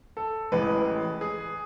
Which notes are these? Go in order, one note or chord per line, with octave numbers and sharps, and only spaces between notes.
A4
A1 A2 E3 G#3 B4
G#4